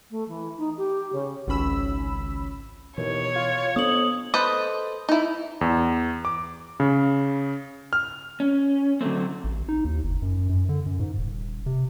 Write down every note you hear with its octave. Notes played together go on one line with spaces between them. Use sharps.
A3
E3
D#4
G4
C#3
G#1 C#2 C#4 B5 E6
D#2 B2 E3 C#5
F4
F2 B3 D4 D#6 F#7
A4 B4 C5 D#5
D#4 E4
E2
D6
C#3
F6
C#4
D3 F#3 G#3 A3 C4
A1
D#4
D#2
F#1
F#2
F#2
D3
F#2
G#2
D#1
C3